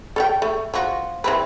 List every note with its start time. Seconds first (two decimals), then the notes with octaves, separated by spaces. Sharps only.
0.16 A4 F5 G5
0.42 A3
0.74 F3 F#4
1.24 E3 C4 B4